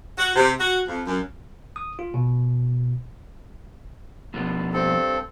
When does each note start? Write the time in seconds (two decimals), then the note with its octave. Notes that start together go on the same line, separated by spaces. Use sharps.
0.17 F#4
0.35 C3
0.60 F#4
0.87 F2
1.06 F#2
1.76 D#6
1.99 F4
2.14 B2
4.34 B2 F3
4.73 G2 C4 A4